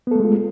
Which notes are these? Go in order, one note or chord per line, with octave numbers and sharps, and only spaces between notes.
G#3 A3 B3 F4 A4